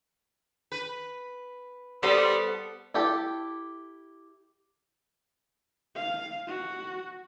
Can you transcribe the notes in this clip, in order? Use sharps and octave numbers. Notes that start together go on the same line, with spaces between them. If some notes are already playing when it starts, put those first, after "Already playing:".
B4
G3 B3 A4 C5 D#6
E4 G4 A4
F5
F#4